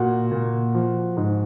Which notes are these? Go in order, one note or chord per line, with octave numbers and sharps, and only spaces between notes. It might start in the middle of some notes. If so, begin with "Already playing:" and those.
Already playing: A#2 F#4
A#2
F3
G#2